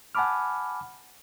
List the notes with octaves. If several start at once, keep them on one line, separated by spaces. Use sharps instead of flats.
F#5 G#5 A5 B5 D6 F6